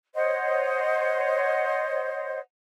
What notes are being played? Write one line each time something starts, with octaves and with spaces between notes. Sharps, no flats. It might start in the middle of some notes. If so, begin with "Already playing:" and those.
C5 C#5 D#5 F#5